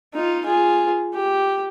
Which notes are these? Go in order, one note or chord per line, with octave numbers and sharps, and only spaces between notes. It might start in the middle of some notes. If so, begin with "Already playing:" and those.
D#4 F4
F4 G#4
G4